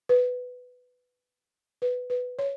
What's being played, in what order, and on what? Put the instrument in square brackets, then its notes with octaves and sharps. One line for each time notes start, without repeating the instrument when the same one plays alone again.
[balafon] B4
B4
B4
C#5